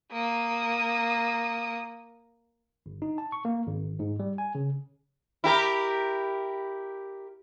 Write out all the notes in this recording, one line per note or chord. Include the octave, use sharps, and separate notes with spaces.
A#3 D#6
G1
D#4
A5
C#6
A#3
G#1
G#2
G3
G#5
C#3
E4 G4 A#4